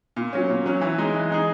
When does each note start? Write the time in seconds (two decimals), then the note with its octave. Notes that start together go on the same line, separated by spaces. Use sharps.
0.16 A#2
0.33 F#3 C#4
0.49 A#2
0.66 F#3 C#4
0.81 E3
0.98 G#3 D#4 G#4
1.14 E3
1.31 G#3 D#4 G#4